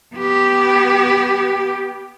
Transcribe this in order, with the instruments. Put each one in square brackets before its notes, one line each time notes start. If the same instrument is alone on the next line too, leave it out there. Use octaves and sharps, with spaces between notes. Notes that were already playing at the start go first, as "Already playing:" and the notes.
[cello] B3 G4